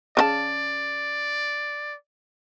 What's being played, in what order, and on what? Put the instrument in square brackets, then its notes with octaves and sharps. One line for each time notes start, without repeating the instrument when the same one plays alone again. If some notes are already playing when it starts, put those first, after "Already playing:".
[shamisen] C#3 F4 A5 [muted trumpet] D5